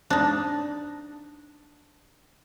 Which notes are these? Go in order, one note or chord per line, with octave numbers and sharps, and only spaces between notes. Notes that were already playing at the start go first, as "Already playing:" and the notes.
D4 D#4